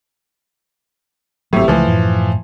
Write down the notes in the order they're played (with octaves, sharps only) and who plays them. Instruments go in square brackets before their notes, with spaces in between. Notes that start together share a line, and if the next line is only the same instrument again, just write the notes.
[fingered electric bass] G#1 F#3 [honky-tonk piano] A2 C3
[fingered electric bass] C#2 A3 [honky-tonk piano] E3 F3
[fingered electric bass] F#2 A2